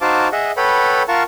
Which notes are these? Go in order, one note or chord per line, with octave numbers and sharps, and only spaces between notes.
D#4 F#4 C5 F5 A5 D6
G#4 D#5 E5 F#5
A4 B4 C#5 F#5 G5 B5
F4 A#4 F5 F#5 A5 C#6